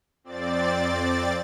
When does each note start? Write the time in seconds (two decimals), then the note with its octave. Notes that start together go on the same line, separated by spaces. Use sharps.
0.24 F2 C4 D5 A6